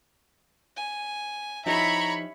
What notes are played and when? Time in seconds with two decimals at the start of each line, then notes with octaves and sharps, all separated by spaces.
0.77 G#5
1.66 F3 D#4 E4 G4 C#5 E5 A#5 B5